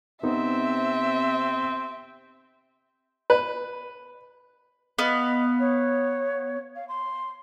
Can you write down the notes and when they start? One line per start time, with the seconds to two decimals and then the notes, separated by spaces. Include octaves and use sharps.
0.23 C3 B3 C4 D#4 E5
3.30 B4
4.99 B3 D#5 F5
5.60 C#5
6.76 F5
6.89 C6